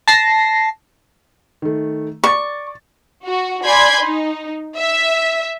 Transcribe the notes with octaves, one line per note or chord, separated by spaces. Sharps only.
A5 A#6 C7
D#3 A3
D5 C#6 D6 A6
F#4
D5 G#5 B5 C6 G6 G#6
D#4
E5